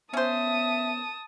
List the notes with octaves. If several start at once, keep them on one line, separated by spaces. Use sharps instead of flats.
B3 C#4 C5 E5 A5 D#6